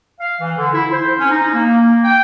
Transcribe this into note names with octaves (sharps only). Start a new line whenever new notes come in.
F5
E3
D3
E4
C5
C#4
D#4
A#3
G5